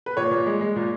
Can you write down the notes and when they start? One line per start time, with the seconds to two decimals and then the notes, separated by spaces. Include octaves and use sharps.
0.06 B4
0.17 A#2 C#5
0.31 A#2
0.46 G#3
0.61 G#3
0.76 A#2